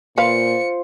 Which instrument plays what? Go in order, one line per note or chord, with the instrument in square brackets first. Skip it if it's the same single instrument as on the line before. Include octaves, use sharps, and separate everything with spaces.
[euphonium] A#2 [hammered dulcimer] F4 C5 [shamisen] B4 F5 [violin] C#7